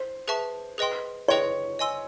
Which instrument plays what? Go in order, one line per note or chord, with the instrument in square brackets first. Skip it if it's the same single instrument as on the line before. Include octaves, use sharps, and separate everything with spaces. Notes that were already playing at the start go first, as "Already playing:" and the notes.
Already playing: [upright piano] C5
[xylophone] G#4 B4 E5 A5 C#6
G#4 B4 D#5 G5 C6
[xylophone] G#4 B4 D#5 G5 C6 [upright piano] C#5
[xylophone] D#5 G#5 C6 E6